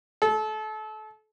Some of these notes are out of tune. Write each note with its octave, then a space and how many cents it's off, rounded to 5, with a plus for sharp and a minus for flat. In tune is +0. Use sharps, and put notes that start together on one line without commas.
A4 -30